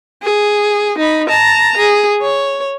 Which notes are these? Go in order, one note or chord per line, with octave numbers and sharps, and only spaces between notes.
G#4
D#4 B5
A5 A#5
G#4
C#5